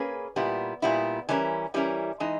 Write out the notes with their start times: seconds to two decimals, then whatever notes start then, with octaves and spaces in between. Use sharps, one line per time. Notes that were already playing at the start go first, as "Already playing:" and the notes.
Already playing: A#3 C#4 G#4 B4
0.36 A#2 G3 B3 E4
0.82 A#2 G3 B3 E4
1.29 E3 G3 C#4 E4 A#4
1.74 E3 G3 C#4 E4 A#4
2.20 E3 G#3 D#4